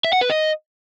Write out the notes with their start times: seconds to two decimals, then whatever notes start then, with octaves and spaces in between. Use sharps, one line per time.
0.04 E5
0.13 F#5
0.21 B4
0.30 D#5